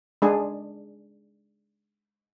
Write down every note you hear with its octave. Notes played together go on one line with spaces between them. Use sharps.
G#3 D4 G#4